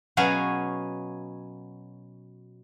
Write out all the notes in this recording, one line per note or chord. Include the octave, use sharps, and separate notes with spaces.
B2 F#3 C#4 G#4 C#5 F5